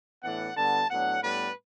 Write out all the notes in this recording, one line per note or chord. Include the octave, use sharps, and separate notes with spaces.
A2 E3 B3 D4 F#5
D3 G3 B3 A5
A2 F#3 B3 D4 F#5
A2 G3 B3 D4 B4